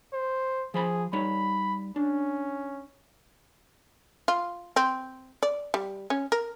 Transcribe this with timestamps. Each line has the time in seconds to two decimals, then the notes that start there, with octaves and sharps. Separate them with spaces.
0.13 C5
0.74 F3 G#4 C5 B5
1.13 G3 D#4 C#5 B5
1.96 C#4 D4
4.28 F4
4.76 C4
5.43 D5
5.74 G3
6.10 C#4
6.32 A#4